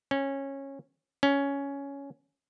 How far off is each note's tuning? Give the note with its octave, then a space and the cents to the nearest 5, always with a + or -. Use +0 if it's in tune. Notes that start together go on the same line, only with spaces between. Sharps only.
C#4 -15
C#4 +10